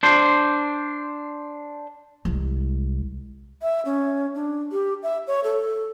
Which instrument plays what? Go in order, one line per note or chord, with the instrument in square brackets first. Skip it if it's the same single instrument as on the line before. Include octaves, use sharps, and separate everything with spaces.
[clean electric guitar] D4 C5
[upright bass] C2 G#3
[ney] E5
C#4
D4
G4
E5
C#5
A4